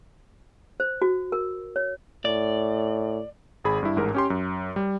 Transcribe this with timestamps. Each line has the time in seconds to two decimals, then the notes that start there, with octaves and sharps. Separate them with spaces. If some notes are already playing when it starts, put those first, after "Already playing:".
0.80 C5
1.02 F#4
1.32 A#4
1.76 C#5
2.25 A2 D5
3.64 G#1 G#4 B5
3.83 G2 E4
3.96 A1 G#2 A#4
4.14 C#4 G4 C6
4.30 F#2
4.76 G3